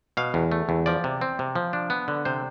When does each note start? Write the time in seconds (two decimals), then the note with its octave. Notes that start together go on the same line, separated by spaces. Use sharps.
0.17 B2 F5
0.34 E2
0.52 A3
0.69 E2
0.86 F3 D5
1.04 C3
1.21 C4
1.39 C3
1.56 F3
1.73 D4
1.90 B3
2.08 D3
2.25 C3 C5